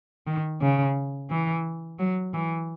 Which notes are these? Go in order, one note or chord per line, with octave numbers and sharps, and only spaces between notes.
D#3
C#3
E3
F#3
E3